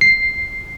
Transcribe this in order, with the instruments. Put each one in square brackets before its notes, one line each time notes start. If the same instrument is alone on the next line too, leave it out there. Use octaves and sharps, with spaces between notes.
[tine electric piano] C7